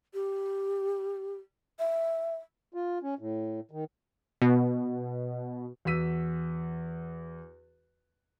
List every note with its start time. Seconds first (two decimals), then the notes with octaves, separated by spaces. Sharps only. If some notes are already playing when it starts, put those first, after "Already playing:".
0.14 G4
1.79 E5
2.74 F4
3.03 C#4
3.19 A2
3.71 D#3
4.42 B2
5.85 E2 F#4 E6 B6 D#7